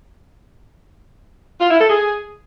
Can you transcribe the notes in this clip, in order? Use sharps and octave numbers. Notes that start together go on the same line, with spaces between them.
F4
E4
A4
G#4